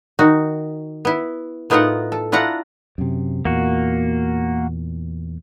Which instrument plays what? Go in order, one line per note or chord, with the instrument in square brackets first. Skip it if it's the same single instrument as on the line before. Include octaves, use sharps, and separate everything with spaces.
[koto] D#3 D#4 F#4
B3 E4
A2 B3 D#4 F4 A#4 F#5
A4
D4 E4 F4 F#5 A#5
[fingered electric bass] F#2 C3
[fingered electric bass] E2 A#2 [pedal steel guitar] A#3 F#4